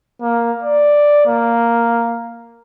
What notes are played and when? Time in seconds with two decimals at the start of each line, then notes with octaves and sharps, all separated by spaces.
0.21 A#3
0.62 D5
1.26 A#3